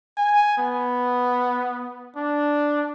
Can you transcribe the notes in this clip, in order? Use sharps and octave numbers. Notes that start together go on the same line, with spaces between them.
G#5
B3
D4